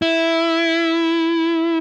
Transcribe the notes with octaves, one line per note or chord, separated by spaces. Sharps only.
E4